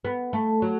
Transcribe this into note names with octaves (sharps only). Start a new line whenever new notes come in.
B3
A3
F#3